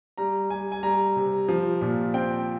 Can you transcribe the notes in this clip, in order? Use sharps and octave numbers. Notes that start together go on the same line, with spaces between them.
G3 A#5
G3 G#5
G#5
G3 A#5
C3
F3
A#2
C4 G5